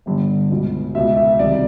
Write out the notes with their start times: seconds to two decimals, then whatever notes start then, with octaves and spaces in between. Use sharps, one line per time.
0.06 G1 G2 D3
0.50 C#2 B2
0.95 C#2 B2 E5
1.17 E5
1.39 C2 C3 D#3 D5